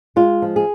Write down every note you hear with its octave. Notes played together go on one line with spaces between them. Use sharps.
G#3 F4
F3
G#4